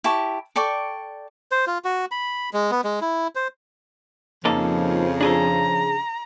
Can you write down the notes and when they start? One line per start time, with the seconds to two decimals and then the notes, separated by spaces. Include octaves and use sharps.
0.04 E4 G4 A5 C#6
0.56 A4 D5 G5 C#6
1.51 C5
1.67 F4
1.85 F#4
2.11 B5
2.53 G#3
2.71 B3
2.84 G#3
3.01 E4
3.35 C5
4.45 F2 C#3 F3 A#3 D#4 A4
5.21 D4 G#4 A4 A#5